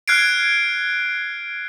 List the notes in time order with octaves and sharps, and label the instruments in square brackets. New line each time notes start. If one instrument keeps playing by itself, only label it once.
[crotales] F6 F#6 G#6 C7 D7